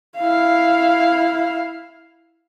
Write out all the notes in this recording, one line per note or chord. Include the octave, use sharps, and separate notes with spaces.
E4 F5